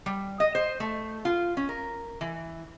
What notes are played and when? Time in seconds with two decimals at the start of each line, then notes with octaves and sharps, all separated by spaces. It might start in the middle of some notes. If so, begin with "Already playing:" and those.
0.06 G3
0.40 D#5
0.55 C5
0.80 A3
1.25 F4
1.57 C#4
1.69 A#4
2.21 E3